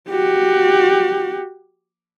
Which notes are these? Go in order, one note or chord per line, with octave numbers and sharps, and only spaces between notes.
F#4 G4